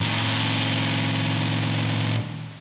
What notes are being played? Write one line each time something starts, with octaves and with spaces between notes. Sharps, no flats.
A2 D#3